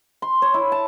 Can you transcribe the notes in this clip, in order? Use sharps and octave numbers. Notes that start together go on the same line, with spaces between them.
C6
C#5
E4
A5